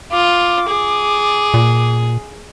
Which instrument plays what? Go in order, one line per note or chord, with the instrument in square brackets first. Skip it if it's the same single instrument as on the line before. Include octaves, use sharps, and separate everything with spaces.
[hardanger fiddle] F4 [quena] D6
[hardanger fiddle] G#4
[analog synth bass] A#2